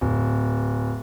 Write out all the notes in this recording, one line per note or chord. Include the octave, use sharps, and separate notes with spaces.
D1